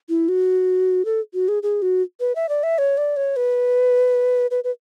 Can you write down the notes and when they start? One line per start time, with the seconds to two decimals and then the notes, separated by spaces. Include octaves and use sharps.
0.09 E4
0.28 F#4
1.05 A4
1.34 F#4
1.48 G#4
1.63 G#4
1.82 F#4
2.20 B4
2.35 E5
2.49 D5
2.63 E5
2.78 C#5
2.98 D5
3.17 C#5
3.36 B4
4.51 B4
4.64 B4